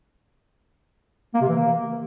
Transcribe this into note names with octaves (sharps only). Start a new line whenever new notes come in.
A#3
C3
E3
A#3